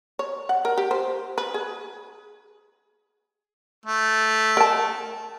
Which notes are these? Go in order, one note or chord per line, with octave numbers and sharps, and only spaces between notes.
C#5
F#5
A#4
G4
C5
B4
G#4
A3
A#4 A5